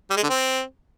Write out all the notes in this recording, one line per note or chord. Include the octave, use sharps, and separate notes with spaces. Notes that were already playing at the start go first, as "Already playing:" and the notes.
G3
G#3
D3
C4